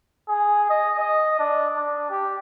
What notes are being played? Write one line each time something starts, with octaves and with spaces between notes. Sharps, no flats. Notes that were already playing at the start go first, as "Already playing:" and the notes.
G#4
D#5
D#5
D4
D4
G4